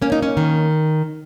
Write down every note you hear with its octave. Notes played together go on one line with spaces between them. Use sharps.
A#3 C#4
D#4
C#4
D#3